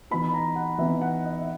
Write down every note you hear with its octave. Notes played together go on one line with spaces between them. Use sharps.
E3 B3 D#4 B5
A#5
F#5
E3 B3 D#4 E5
F#5
D#5
E5